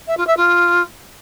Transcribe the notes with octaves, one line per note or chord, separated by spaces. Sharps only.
E5
F4
E5
F4